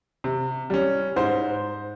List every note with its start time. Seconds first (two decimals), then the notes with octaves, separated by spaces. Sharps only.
0.24 C3
0.70 G3 C#4
1.16 G#2 C5